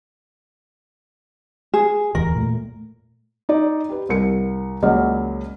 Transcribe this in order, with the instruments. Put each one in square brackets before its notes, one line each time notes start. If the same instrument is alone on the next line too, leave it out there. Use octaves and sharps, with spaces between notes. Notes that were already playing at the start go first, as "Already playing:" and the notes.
[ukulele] G#4
[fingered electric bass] D1 E2 E3 [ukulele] A#4
[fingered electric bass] A#2 A3
[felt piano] D#4 D5
G4 B4
C2 A#4 C#7
C#2 F#3 A#3 C#4 D5 F6